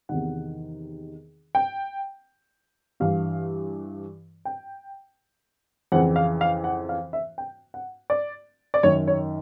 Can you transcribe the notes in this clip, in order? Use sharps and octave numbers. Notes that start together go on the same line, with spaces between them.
E2 C3 D#3 F#5
G5
G2 E3 F5
G5
F2 C#3 E3 F#5
F5
F5
F#5
F5
E5
G5
F#5
D5
D5
F#2 D#3 C#5
C#5